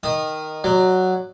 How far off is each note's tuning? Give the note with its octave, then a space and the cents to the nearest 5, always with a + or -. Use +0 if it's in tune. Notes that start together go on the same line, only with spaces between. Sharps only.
D#3 +0 D#6 -20
F#3 +0 D5 +40